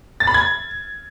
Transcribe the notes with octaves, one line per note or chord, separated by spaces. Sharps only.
A6
B5
G#6